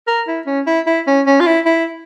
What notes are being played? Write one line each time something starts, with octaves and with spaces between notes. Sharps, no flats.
A#4
E4
C#4
E4
E4
C#4
C#4
F4
E4
E4